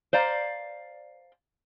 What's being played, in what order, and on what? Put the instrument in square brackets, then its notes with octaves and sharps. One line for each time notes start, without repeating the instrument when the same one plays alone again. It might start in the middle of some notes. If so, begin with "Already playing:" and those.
[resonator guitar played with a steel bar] C5 D5 F5 A#5